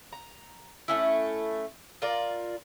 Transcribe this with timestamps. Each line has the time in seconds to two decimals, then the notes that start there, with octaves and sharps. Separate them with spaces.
0.12 A#5
0.88 A3 C#4 E4
2.02 F4 A#4 D5